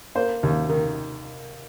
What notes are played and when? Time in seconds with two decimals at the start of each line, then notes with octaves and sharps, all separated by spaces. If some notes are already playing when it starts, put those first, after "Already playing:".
0.15 A#3 C5
0.43 D#2
0.69 D#3